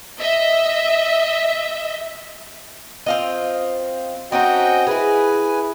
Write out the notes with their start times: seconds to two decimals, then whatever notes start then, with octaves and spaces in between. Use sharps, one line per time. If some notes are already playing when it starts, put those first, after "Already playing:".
0.19 D#5 E5
3.06 C4 F4 D#5
4.32 C4 C#4 D#4 F#4 D#5 G5
4.87 E4 G#4 B4 G#5